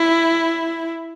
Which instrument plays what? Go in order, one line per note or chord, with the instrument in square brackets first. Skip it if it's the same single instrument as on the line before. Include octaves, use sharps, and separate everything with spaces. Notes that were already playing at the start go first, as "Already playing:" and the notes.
Already playing: [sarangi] E4